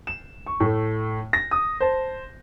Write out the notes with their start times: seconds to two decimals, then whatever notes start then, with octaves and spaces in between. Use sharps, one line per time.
0.07 E7
0.46 C#6
0.60 A2 A3
1.33 A#6
1.51 D#6
1.81 C5 A5